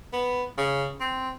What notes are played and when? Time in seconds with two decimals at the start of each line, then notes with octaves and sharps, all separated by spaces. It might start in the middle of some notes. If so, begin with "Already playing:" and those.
0.13 B3
0.58 C#3
1.01 C4